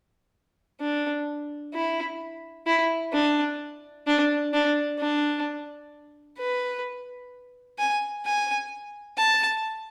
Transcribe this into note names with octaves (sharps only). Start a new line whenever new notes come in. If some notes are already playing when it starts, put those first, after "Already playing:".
D4
E4
E4
D4
D4
D4
D4
B4
G#5
G#5
A5